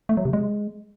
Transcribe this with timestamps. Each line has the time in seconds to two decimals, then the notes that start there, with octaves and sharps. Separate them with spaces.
0.09 A3
0.17 F#3
0.25 C3
0.33 G#3